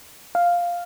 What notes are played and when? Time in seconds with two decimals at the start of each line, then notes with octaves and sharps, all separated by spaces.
0.35 F5